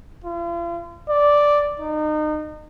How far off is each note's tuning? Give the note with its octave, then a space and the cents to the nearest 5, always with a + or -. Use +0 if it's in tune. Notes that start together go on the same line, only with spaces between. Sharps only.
F4 -40
D5 -5
D#4 -30